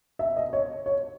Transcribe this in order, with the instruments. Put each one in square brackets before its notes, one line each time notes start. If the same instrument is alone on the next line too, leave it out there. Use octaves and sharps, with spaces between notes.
[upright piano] E5
D#5
C#5
C#5